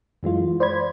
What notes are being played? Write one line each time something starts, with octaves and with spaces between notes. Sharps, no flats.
F#2 E3 G#3 F4
C5 D5 B5 G#6